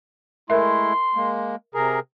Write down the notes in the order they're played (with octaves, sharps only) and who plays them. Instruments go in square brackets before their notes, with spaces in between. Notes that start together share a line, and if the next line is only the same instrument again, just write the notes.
[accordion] G#3 A3 E4 [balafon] A#4 E5 [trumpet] C6
[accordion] G#3 A#3
[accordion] C3 G#4 A#4 [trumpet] A#5